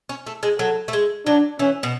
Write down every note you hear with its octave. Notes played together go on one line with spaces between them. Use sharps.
C#4
A3
G#3
F#3 A4
A3
G#3
F#3 D4
E3 C#4
B2